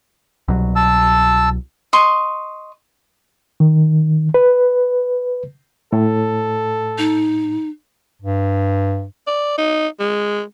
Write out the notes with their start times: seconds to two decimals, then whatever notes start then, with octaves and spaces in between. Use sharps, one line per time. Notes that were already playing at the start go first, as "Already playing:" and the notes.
0.48 C2 B2 F#3
0.76 A5 E6
1.93 D#5 C6 C#6
3.60 D#3
4.34 B4
5.93 A2 A4
6.98 D#4
8.22 G2
9.27 D5
9.58 D#4
10.00 G#3